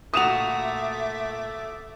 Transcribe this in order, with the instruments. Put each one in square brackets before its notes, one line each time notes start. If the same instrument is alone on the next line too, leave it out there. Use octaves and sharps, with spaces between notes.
[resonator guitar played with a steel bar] A#2 F#4 [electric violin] A3 D6 [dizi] E5 [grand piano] D#6 E7 F7